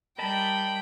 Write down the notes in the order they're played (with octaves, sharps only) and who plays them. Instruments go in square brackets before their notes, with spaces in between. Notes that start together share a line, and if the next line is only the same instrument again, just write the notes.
[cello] G3 [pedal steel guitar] A#4 D#5 A5 [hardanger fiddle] G5 [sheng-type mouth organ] B5